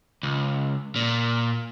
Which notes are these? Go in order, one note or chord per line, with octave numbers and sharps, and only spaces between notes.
C#2
A#2